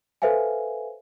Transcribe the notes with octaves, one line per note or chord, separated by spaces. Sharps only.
A4 B4 C5 E5 F5 G#5